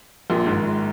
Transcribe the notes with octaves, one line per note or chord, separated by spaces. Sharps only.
A#1 A#2
G#1 G#2